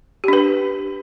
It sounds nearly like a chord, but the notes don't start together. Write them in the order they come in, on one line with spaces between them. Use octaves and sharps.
G4 D4 B4